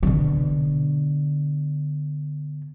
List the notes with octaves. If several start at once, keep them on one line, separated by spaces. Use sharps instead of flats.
B2 D3